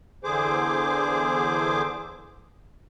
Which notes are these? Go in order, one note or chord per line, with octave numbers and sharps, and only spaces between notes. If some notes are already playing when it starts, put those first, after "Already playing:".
E2 D3 G#4 C5 D6